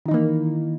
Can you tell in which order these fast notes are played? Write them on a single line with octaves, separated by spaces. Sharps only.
D#3 D#4 E3 A#3